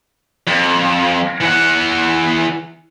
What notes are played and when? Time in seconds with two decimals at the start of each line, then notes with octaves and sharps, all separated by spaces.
0.47 F2
1.40 E3 F#5